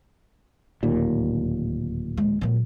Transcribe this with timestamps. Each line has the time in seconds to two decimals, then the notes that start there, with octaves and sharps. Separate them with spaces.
0.83 D1 D#2 A#2
2.17 G#3
2.41 A#2 F#3